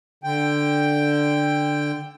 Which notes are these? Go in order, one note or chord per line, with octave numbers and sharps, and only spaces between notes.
D3 G5